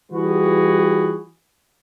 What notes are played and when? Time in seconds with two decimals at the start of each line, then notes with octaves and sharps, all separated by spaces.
0.12 E3 G3 F4 F#4 G#4 B4